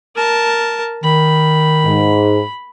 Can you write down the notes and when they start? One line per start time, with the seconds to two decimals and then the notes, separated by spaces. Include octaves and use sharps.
0.15 A#4 A5
1.04 D#3 B5
1.84 G#2